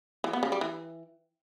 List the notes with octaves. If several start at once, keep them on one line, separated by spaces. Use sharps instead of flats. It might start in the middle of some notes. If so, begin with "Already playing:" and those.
E3
B3
C#3
G3
E3